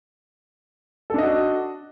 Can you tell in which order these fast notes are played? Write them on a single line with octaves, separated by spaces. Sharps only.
A4 D4 D#5 F#4